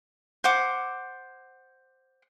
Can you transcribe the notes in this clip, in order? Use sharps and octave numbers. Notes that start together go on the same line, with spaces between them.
C5 F#5 D6